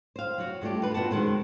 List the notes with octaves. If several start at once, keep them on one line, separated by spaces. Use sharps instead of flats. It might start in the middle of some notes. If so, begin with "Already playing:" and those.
C5 F5
F#3 F#4
G2 A3 F4 G4
F4 B4
B2 B3 F4 F#4 F#5 A5
F#2 D#3 G#3 C5